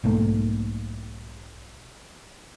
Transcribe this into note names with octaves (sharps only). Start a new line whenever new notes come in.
B1 G#2 A3 A#3